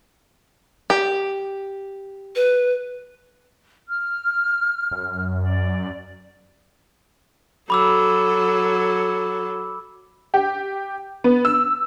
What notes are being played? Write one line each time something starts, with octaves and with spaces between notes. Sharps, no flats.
G4
B4
F6
F#2
D5
F#3 A4 B5 D6 E6
G4
B3
E6